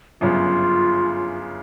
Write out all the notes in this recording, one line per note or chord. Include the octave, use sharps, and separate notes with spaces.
G1 F#2 C#3 F4